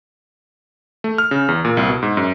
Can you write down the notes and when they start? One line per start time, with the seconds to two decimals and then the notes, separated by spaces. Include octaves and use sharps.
1.04 A3
1.18 F6
1.31 C#3
1.48 E2
1.65 A#2
1.77 C2
1.89 B2
2.02 G#2
2.17 F#2